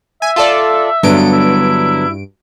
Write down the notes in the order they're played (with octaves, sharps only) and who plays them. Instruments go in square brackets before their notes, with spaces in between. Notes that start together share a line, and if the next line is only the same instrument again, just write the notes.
[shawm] E5 [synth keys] G#5
[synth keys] F4 A4 D5
[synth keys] G2 D7 [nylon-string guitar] D3 F#3 B3
[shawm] E4